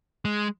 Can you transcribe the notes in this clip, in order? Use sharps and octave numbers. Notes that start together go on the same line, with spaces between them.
G#3